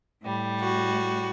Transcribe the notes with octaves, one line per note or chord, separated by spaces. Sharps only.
A2 G3
F#4